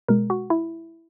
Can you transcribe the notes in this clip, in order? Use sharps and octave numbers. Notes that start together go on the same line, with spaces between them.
B2 G#3 A#4
F#4
E4